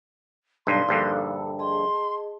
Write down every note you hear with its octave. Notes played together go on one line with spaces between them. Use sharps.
B1 G2 D#4 D5 F5 C6
A#1 G2 D3
A4
G#4 D#5 A5 C6